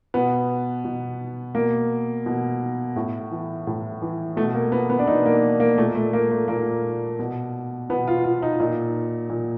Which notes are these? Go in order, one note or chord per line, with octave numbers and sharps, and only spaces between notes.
B2 B3
B2
B2 A#3
B2
A2
E3
A2
E3
B2 A3
A#3
B3
B3
D4
B2 D#4
A#3
A#3
A#2 A3
A3
A#3
A3
A#2 A#3
B2
B2 B3
F4
F4
D#4
A#2 D#4
A#2